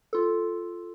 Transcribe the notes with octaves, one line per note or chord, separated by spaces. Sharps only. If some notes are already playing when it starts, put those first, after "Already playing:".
F4 A4